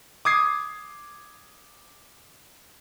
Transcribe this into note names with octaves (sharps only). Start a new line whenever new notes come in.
D6 D#6 G#6 C7